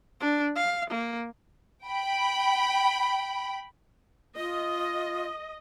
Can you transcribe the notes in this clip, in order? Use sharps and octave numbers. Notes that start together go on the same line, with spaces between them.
D4
F5
A#3
G5 B5
F4 D#5